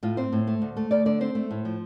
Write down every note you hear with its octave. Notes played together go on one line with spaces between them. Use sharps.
A2 F4
C4 C5
A2
A3
D2
A3
D2 D5
D3 D5
C4 C5
A3
A2
F3